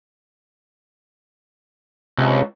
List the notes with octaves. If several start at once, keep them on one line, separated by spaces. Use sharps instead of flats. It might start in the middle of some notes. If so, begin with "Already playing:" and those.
C#2 C3